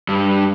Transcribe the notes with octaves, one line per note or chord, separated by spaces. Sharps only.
G2